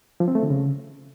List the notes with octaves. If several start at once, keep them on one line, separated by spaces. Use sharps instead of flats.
F3
C4
A3
D3
C#3